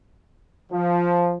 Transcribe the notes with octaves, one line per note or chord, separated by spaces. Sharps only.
F3